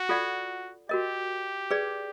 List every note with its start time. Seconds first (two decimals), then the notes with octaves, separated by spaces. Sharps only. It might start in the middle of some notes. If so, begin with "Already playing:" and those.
Already playing: F#4
0.09 F4 A4 D5 F#5
0.89 F#4 G4 A#4 D#5
1.71 G#4 B4 D5